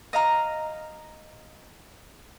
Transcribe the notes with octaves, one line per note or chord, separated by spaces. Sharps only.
D#5 F5 A#5